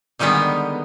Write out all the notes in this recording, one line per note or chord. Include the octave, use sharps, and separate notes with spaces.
D3 D#3 G3 G#3 B3